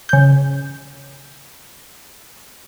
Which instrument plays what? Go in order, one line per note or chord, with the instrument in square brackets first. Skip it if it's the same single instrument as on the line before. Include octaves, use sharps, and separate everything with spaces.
[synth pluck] C#3 G6